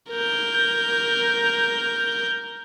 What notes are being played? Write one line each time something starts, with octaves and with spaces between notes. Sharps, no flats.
A#4 G6